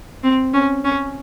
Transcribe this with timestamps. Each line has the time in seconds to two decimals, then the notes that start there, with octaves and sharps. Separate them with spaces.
0.23 C4
0.54 C#4
0.84 C#4